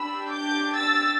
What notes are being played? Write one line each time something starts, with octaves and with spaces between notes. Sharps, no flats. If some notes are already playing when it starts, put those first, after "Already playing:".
Already playing: D4 G4 B5 E6
D6 G6
E6 A6